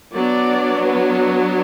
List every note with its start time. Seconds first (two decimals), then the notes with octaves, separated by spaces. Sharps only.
0.14 F#3 B3 D4 D5
0.85 B4